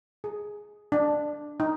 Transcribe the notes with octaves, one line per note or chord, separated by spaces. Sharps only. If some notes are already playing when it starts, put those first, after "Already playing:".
G#4
D4
D#4